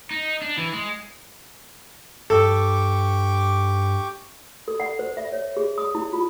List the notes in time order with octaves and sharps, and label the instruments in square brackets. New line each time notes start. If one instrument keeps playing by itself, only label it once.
[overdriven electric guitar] D#4
D4
E3
G#3
[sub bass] G2 [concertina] G4 C#6 D6 [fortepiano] A4
[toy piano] A4
F#5
C5
E5
C#5
G#4
D#6
E4
F4